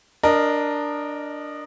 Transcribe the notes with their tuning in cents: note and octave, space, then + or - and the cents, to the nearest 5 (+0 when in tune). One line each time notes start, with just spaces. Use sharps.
D4 +0 A#4 +0 D#5 -20